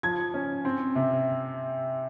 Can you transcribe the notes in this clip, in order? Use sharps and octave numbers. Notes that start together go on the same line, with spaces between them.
F3 G#6
C#4
C4
C3